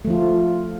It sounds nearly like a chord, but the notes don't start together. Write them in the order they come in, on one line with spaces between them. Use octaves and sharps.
A3 F3 F4